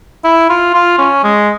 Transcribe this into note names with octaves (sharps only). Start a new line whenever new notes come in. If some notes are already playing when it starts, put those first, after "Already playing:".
E4
F4
F4
C#4
G#3